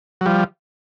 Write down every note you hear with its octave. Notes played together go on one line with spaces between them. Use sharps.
F#3
F3 G3